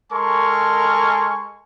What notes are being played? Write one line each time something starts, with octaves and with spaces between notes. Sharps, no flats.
G#3 A4 A#4 G#5 C6 C#6